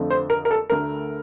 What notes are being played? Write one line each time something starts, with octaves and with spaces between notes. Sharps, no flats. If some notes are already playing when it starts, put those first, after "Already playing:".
Already playing: F2 D3 F3 A3
C5
A#4
A#4
A4
D2 D3 A3 A#4